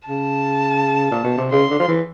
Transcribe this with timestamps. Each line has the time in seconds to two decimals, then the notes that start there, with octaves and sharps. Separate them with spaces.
0.08 C#3 A5
1.11 A#2
1.24 B2
1.38 C3
1.52 C#3 C6
1.70 D3
1.79 F3
1.88 E3